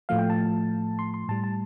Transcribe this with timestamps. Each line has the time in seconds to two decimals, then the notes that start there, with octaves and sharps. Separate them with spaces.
0.09 A2 F3 A3 F5
0.19 G5
0.30 A5
0.99 C6
1.14 C6
1.28 A2 G3 A5
1.44 A5